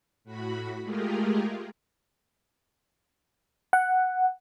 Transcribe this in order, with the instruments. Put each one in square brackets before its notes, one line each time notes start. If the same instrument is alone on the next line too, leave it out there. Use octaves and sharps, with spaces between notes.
[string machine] A2 F#4 B5
G#3 A3 F4 G4 G#4 A#4
[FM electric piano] F#5